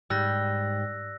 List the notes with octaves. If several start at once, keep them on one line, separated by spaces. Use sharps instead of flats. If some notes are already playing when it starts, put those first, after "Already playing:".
G#2 G3 E6 F#6 A#6